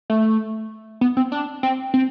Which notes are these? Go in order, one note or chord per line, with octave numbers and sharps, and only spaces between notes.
A3
B3
C4
D4
C4
C4